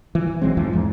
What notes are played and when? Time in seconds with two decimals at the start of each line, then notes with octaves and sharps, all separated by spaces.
0.15 E3
0.42 B1 F#3 G#3 C4
0.57 F2 G#2 E3 F3
0.73 E2 G#2